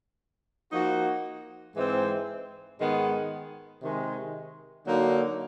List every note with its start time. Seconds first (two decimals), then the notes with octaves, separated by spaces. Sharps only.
0.71 F3 A#3 D#4 F#4
1.75 G#2 E3 G#3 C4
2.78 G#2 D#3 G#3 B3
3.82 C3 D#3 G#3
4.85 D3 F#3 A#3 D#4 F#4